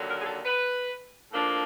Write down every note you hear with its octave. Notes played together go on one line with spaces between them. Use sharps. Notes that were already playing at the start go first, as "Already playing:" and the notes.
Already playing: D#2 D3 F#3
A#4
G#4
A4
B4
A2 F3 A#3 D4